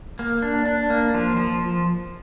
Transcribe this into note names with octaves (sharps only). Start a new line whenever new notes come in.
A#3
D4
D4
A#3
F3
F3